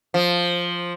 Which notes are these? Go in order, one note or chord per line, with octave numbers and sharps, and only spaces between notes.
F3